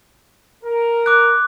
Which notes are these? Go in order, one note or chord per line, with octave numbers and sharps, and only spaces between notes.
A#4
D6 F#6